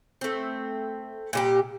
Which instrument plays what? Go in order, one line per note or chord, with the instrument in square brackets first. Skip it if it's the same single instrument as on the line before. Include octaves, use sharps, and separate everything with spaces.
[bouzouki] A3 C4
A#2 G3 G4